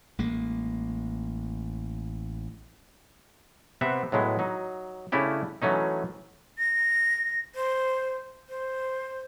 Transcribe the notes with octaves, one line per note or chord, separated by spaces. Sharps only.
A1 G#3 A#3
C3 B3 C4 E5 F#5
A2 F#3 G#3 B3
F#3 D#4
C#3 A3 C#4 D4 E4 G4
E3 F#3 A3 C#4 D#4
A#6
C5
C5